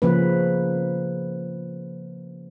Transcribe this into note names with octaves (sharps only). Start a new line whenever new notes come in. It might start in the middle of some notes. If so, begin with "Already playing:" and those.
C#3 F3 A#3 C#4 B4